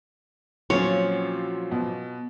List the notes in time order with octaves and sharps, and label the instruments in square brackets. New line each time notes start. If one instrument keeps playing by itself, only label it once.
[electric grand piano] A#2 F#3 C4 [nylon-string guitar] F3 C#4 [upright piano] F4 [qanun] C#5
[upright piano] B2